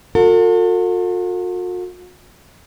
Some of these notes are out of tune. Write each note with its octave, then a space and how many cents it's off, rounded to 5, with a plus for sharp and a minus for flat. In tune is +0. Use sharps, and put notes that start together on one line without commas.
F#4 -45 A4 +40